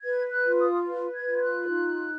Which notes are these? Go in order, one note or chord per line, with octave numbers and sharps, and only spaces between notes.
B4 G#6
F#6
F4
D#6
B4
G#6
F4
G#6
F#6
D#4